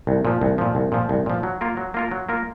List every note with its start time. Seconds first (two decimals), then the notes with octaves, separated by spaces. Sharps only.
0.07 C2
0.25 A#2 F3
0.41 C2
0.58 A#2 F3
0.75 C2
0.92 A#2 F3
1.09 C2
1.26 A#2 F3
1.43 F#3
1.61 A#3 F4 A#4
1.77 F#3
1.94 A#3 F4 A#4
2.11 F#3
2.29 A#3 F4 A#4